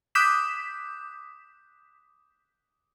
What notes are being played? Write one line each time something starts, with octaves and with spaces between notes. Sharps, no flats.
D6 D#6 F#6 G6 B6 E7